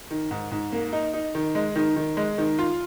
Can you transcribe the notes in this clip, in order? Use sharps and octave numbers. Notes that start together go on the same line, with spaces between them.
D#3
G#2
G#2
A#3
D#4
D#4
D#3
G#3
D#3
D#3
G#3
D#3
F4